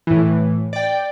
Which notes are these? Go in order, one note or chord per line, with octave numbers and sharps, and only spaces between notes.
A2 E3
D5 G5